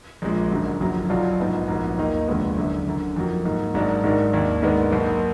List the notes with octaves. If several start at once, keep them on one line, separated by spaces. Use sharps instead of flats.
A#1 A#2 G#3
G#1 F#2 D3 F#3
F#1 F2 D3 F#3
B1 B2 F#3 D4 F4
A#1 G#2 F3 B3 D#4
A#1 G#2 F#3 B3
D#2 D#3 A#3 D#4
F1 D#2 D3 G#3 B3
F#1 F#2 D3
F#1 F#2 D3
F2 D#3 F#3
G#2 D#3 A#3
G#1 G#2 F#3 D4
G#1 G#2 D#3 F#3 D4
D#2 D#3 A#3 D4
G#2 D#3 G#3 B3 D4
B1 B2 A#3